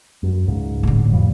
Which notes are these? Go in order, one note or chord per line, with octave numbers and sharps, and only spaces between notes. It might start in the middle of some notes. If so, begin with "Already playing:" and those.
F#2
C#2 G#2
A2 D3
F2 F3 G3